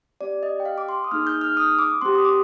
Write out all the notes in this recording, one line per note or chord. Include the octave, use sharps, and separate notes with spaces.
C4 G4 D5
D#5
G5
F5
D6
C6
D#6
A#3 D#4 G#4 F6
G6
F6
D#6
D6
C4 G4 C6
D#6
D6